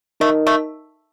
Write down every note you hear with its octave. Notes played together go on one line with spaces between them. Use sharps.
A3 D#4 A#4 D#5
A3